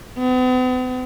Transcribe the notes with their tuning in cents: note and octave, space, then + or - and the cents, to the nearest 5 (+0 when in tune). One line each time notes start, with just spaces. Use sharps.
B3 +45